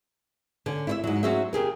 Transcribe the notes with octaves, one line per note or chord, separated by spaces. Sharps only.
D3 C#4
E4 C#5 E5
G#2 F#3
F#3 C#4 F#4 G#4 C5 E5
C#3 G4 G#4 A#4